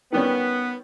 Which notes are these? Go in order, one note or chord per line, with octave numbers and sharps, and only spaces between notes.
D#3 G3 B3 C#4